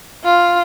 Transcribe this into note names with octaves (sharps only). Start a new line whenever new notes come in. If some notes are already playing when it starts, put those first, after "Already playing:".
F4